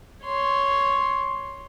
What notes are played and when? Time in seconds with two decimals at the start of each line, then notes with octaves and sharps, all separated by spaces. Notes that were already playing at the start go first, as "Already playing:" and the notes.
0.24 C#5 C6